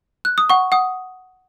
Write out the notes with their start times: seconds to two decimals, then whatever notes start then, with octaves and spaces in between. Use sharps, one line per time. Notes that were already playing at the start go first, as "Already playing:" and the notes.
0.25 F#6
0.38 D#6
0.50 F#5 C#6
0.72 F#5 D#6